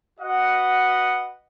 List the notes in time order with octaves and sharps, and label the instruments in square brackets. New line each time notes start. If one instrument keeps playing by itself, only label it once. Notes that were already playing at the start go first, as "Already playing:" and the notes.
[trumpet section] F#4 B4 D#5 F#5